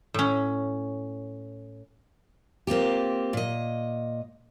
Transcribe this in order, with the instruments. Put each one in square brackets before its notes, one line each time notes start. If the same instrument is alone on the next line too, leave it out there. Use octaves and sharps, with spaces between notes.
[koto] A2 C#4
[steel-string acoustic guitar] A#3 C4 F4 G4
A#2 D#5